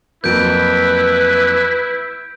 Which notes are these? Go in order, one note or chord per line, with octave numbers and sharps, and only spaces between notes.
F2 F#3 A#3 E4 B4 G6 D7